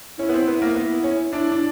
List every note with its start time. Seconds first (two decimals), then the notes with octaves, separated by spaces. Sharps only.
0.19 C#4 E4
0.29 B3
0.34 C4
0.48 B3
0.62 A#3
0.76 B3 E4
1.04 C#4
1.33 D4 E4
1.52 D4